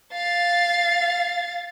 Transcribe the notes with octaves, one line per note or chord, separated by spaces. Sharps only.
F5 A6